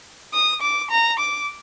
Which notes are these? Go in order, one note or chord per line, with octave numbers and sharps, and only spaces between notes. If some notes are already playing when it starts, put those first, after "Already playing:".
D#6
D6
A#5
D6